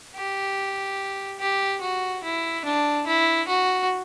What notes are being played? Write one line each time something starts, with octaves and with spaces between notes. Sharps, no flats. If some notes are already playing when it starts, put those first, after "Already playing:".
G4
G4
F#4
E4
D4
E4
F#4